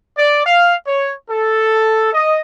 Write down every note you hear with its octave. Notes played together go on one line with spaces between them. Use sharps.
D5
F5
C#5
A4
D#5